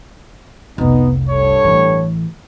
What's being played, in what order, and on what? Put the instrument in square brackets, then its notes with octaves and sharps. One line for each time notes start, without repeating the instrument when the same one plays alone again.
[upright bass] F1 C2 [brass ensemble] B3 D#4
[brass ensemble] G2 A4 C#5
[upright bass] A1 E3